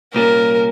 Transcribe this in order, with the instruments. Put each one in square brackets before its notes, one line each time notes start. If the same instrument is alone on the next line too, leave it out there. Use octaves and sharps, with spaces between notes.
[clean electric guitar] C2 A#2 G3 A#3 C#4 [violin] A#4